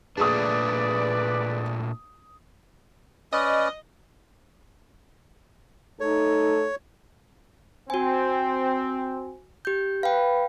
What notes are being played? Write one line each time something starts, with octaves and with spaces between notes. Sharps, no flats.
A#2 A3 D4 G#4 B4 D5 D#6
C#4 B4 D5 D#5
A3 D#4 A4 C#5
C4 F#4 G#5
G4 G6
B4 F5 G5